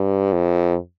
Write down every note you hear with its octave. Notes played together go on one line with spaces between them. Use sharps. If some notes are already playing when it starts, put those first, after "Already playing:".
Already playing: G2
F2